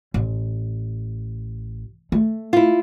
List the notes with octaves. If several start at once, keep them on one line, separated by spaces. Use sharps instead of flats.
A1
A3
E4 F4